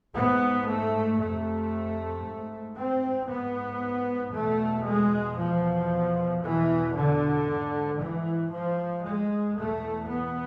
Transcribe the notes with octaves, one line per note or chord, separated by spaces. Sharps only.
G#2 B3
A3
F2 C3 A3
G#2
C4
G#2 B3
E2 B2 A3
G#3
E2 B2 F3
E2 B2 E3
D3
G#2
E3
G#2 F3
G#3
E2 B2 A3
B3